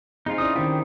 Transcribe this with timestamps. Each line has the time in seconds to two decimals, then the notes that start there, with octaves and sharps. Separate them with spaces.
0.26 C4 D#4 F4 G#4
0.38 C#4 E4 D5 D#6
0.56 D#3 C4 C#4 G4 C5